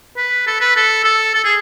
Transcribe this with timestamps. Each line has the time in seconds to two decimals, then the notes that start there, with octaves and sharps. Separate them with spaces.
0.17 B4
0.46 A4
0.60 B4
0.76 A4
1.04 A4
1.34 A4
1.44 G#4